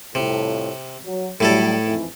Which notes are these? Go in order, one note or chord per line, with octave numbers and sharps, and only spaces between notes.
C2 F2 A2 C3
F#3
A2 F#3 G3 E4 A4
F2 G#2 E3